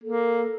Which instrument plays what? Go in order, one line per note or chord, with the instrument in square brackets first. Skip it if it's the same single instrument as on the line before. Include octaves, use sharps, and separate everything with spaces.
[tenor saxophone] A#3 [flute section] A4